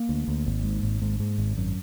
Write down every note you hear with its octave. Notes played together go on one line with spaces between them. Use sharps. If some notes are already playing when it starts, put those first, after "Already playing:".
Already playing: A#3
D2
D2
G#1
G#2
G#1
G#2
G#2
G#1
F#2